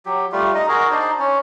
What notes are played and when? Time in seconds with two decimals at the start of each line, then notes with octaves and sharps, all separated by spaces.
0.06 F#3 G4
0.32 G3 A3 F4
0.54 D#4 D#5
0.68 F#4 G#4 A#4
0.91 D4 D#4 C5 D5
1.19 C#4